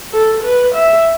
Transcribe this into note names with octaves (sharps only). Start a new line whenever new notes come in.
A4
B4
E5